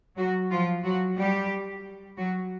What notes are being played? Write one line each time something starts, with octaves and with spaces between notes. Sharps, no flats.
F#3 F#4
F3 F4
F#3 F#4
G3 G4
F#3 F#4